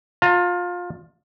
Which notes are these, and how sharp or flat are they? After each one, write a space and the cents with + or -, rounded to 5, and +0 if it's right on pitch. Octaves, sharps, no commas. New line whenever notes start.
F4 +20 A#5 -40